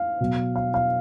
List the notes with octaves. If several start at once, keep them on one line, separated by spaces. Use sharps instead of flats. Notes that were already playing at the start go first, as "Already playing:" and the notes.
Already playing: F5
B2 F#3
F5
F5